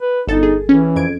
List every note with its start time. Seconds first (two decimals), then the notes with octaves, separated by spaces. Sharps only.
0.01 B4
0.28 G1 D#4 A4 A6
0.43 G#4
0.69 E3 C#4
0.96 F2 G#6 D7